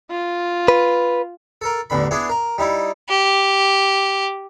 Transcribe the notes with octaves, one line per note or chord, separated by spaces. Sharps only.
F4
B4
A4 A#4
A1 E2 D3 B5
B3 D4 E4 G#4
A#4
G3 D#4 E4
G4